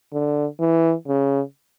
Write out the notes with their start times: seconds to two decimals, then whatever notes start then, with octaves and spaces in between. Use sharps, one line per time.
0.13 D3
0.60 E3
1.08 C#3